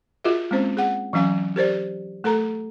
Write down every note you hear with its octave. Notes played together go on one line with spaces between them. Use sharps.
F4 F#4 G#4 A#4 D#5 E5
G#3 A#3 C4 C#4 C5
G#4 F#5
E3 F#3 C#4 F5 G#5
G4 A#4 C5 D5
A3 A4 A#4 A#5